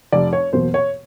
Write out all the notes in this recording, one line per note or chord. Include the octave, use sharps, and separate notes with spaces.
F1 D5
C#5
E2 B2 F#3 A#3 C5
C#5